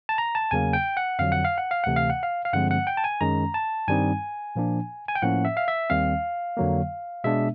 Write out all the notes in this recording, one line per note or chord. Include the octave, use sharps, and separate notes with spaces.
A5
A#5
A5
E2 C#3 F#3 A#3 G#5
G5
F#5
F2 D3 F#3 F5
F#5
F5
F#5
F5
D2 C3 E3 A3 F#5
F5
F#5
F5
F5
G2 D3 F3 G#3 C4 F#5
F#5
G5
A5
G#5
F#2 D#3 G#3 C#4 A#5
A5
G2 D#3 G3 C4 D#4 G#5
A#2 F3 A#3 D4
G#5
G5
A2 F3 A#3 C#4 F#5
E5
F5
E5
D#2 D#3 G3 C4 F5
F2 D3 F#3 A#3
B2 G#3 B3 D4 E5